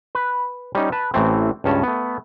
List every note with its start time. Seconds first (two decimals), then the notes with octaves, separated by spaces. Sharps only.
0.15 B4
0.75 G3 C#4 D#4
0.92 B4 A5
1.14 A1 E3 A3 C4
1.64 C#2 G2 C#4 A5
1.83 A3 B3